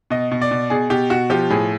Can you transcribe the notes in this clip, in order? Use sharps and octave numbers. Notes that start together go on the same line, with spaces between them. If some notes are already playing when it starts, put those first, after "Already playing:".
B2 D#5
B2
D5
B2
B2 G#4
B2 G4
B2 F#4
F3 G4
A2 G#4